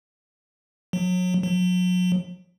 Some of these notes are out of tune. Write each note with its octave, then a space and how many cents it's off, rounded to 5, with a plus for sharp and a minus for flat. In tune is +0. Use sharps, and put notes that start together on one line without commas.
F#3 -30
F#3 -35